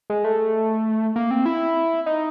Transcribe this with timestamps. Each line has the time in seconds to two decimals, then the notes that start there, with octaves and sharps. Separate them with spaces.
0.10 G#3
0.24 A3
1.16 A#3
1.31 C4
1.46 E4
2.06 D#4